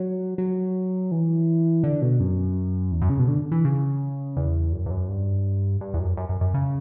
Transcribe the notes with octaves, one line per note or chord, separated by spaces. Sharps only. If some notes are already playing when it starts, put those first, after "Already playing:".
Already playing: F#3
F#3
E3
D3
B2
F#2
E2
F#2
C#3
B2
D3
E3
C#3
E2
F#2
E2
F#2
G2
G2
E2
F#2
F#2
F#2
F#2
C#3